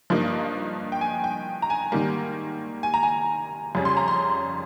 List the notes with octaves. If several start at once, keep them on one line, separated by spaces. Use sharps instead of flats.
G2 F3 A#3 D#4
G5
G#5
G5
A#5
G#5
G#2 D#3 G3 A#3
G#5
A#5
G#5
F2 C#3 G3 C#4
C6
A#5
C6